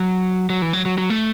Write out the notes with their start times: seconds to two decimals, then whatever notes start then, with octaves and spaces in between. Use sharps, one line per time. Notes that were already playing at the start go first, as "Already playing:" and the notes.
Already playing: F#3
0.50 F#3
0.62 E3
0.73 F#3
0.86 F#3
0.98 F#3
1.10 A3